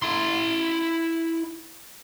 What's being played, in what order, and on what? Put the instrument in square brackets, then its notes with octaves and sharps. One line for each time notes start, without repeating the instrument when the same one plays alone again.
[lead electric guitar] E4 C6